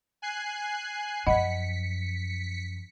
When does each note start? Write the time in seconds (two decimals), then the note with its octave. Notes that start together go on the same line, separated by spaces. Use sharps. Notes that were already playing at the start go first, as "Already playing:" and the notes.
0.22 G#5 F#6 C7
1.27 F#2 F3 D#5 F#5 B5 B6 C#7